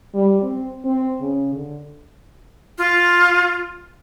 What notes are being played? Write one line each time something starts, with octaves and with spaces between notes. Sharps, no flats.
G3
C4
C4
C#3
D3
F4